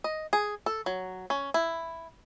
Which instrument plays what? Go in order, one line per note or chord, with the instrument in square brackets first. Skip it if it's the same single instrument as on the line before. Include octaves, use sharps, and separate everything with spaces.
[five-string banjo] D#5
G#4
A4
F#3
C#4
E4